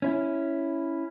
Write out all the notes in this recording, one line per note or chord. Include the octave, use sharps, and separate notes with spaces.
C#4 E4